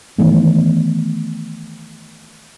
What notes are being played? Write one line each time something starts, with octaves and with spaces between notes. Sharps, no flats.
D#3 E3 A3 B3